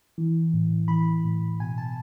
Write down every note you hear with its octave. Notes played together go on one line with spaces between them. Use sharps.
E3
A2
E3 B5
A2
B2 G#5
A5